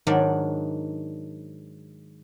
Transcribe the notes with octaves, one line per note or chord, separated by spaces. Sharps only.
G#2 D#3 F#3 D4 C#5 D5